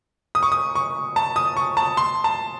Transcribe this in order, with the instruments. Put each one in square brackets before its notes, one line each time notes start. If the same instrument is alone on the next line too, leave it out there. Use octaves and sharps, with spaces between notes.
[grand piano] D#6
C#6
D#6
C#6
A5
D#6
C#6
A5
C6
A5